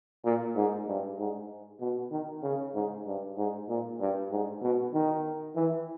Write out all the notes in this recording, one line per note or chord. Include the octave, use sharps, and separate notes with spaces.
A#2
G#2
G2
G#2
B2
D#3
C#3
G#2
G2
G#2
A#2
G2
G#2
B2
D#3
E3